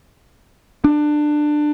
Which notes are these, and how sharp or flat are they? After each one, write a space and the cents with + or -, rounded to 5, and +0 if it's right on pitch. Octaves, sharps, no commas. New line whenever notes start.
D4 +20